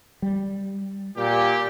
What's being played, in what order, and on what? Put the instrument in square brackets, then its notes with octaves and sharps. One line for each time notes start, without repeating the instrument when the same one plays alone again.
[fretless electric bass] G3
[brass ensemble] A#2 G4